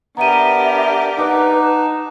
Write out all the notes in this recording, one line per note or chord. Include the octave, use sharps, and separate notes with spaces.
B3 D4 G4 A#4 E5 A#5 D#7
D#4 B4 F#5 D6
A5